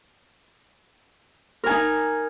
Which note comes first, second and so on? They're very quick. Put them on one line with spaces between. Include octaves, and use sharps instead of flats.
A#4 G#5 D#4